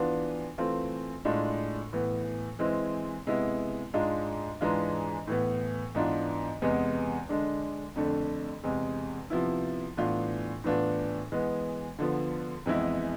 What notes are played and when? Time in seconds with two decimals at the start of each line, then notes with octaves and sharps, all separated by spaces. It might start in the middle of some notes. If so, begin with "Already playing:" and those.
Already playing: E3 B3 D4 F4
0.58 E3 A3 C4 F4
1.25 A2 G#3 D4 F4
1.93 A2 E3 B3
2.59 E3 G#3 C4 E4
3.26 C3 G#3 B3 E4
3.94 G#2 G#3 D4 F4
4.61 G#2 E3 G#3 D4 F4
5.27 A2 E3 B3
5.95 G#2 E3 B3 D4 F4
6.62 E2 C3 G#3 B3
7.29 D3 G#3 D4
7.96 F2 D3 A3 D4
8.64 E2 C3 G#3
9.30 C3 F3 B3 E4
9.97 A2 E3 B3 D4 F4
10.64 A2 E3 B3 D4 F4
11.32 E3 G#3 B3
11.99 D3 F3 B3
12.66 F2 E3 G#3 B3 E4